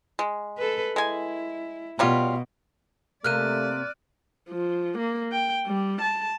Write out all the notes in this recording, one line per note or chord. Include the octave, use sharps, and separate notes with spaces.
G#3
A4 B4
G#3 E4 G#5
B2 F#3 G3 F4
C3 A3 A#3 D5 F6 F#6 D#7
F3
A#3
G5
G3
A5